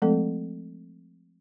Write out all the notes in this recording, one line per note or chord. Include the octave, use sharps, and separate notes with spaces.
F3 G#3 A3 C4 A4